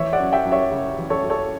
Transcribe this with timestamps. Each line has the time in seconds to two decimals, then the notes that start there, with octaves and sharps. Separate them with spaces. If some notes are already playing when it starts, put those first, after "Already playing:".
Already playing: E3 C#5 E5
0.13 D5 F#5
0.20 F#2
0.33 E5 G5
0.45 F#2
0.52 C#5 E5
0.71 C#3
0.98 E3
1.10 A4 C#5
1.24 F#2
1.30 A4 C#5